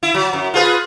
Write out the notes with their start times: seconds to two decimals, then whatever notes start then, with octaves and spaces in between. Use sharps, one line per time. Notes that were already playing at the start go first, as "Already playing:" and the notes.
0.03 E4
0.14 F#3
0.33 F#2
0.54 F4 G#4 B4